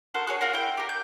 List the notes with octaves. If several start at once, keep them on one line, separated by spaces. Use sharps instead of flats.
F#4 A4 A#4 C5
F#4 G#4 C#5
F4 F#4 A#4
E4 G5
G4 A#4
G6